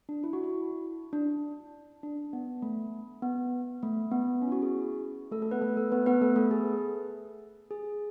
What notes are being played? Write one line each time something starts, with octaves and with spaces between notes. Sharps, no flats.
D4
E4
F#4
E4
D4
D4
B3
A3
B3
A3
B3
C#4
E4
F#4
G#4
A3 A4
A3 A4
B3 B4
A3 A4
A3 A4
B3 B4
B3 B4
A3 A4
A3 A4
G#4
G#4